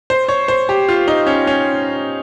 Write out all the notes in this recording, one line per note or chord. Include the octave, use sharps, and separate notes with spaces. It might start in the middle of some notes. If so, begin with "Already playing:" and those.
C5
C#5
C5
G4
F4
D#4
C#4
C#4